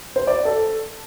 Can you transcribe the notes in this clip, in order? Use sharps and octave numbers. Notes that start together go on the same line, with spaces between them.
C5
D5
A4